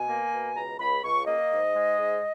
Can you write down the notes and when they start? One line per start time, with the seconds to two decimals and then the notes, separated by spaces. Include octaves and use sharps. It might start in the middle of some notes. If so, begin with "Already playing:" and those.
Already playing: B2 G#5
0.08 A#3
0.32 B2
0.56 C#2 A#5
0.80 C#2 B5
1.04 C#2 C#6
1.27 A#3 D#5
1.52 G#2
1.75 G#3
1.99 G#2